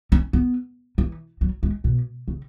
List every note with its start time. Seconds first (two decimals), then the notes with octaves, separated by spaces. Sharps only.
0.12 C#4
0.33 B3
0.98 E3
1.41 F#3
1.63 G#3
1.84 B2
2.28 C#3